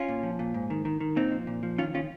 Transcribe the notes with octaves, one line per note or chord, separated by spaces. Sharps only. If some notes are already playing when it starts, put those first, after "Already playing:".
Already playing: C#4 F4
A#2
F3
A#2
G#2
D#3
D#3
D#3
A#2 C4 D#4
F3
A#2
F3
D#3 C#4 F4
D#3 C#4 F4